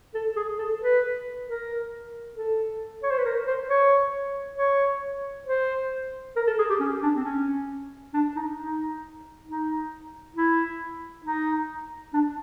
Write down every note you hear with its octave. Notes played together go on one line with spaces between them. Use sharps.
A4
G#4
A4
B4
A#4
A4
C#5
C5
B4
A#4
C5
C#5
C#5
C5
A#4
A4
G#4
G4
C#4
D4
C4
C#4
D4
D#4
D#4
D#4
E4
D#4
D4